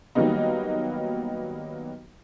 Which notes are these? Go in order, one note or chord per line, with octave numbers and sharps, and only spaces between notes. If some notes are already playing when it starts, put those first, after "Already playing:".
D#3 F#3 G3 A#3 B3 D#4